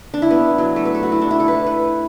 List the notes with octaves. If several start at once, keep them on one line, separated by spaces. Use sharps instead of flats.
D4
E4
B3
F#3
A3
B4
A4
F#4
E4
D4
E4
A4
B4
B4